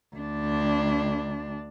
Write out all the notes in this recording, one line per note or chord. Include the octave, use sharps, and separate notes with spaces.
D2 D4